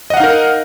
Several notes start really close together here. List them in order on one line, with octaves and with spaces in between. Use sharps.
D#5 F#5 F5 D#4 A#4